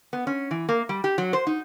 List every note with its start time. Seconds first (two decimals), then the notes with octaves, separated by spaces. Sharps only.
0.13 B3
0.27 C#4
0.51 E3
0.69 A#3
0.89 G3
1.04 G4
1.18 F#3
1.33 C5
1.47 D#4